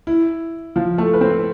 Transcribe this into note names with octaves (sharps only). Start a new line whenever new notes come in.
E4
F3 F4
A3 A4
B4
C4 C5